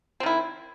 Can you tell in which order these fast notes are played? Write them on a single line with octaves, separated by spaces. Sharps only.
C4 D#3 E4